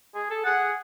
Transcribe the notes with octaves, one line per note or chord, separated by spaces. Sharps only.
G#4
A4
G#4 F#5